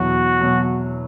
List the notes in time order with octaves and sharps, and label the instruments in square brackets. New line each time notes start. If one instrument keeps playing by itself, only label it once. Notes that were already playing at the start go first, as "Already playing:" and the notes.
Already playing: [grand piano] E2 B2 F#3 [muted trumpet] F#4
[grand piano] B2 F#3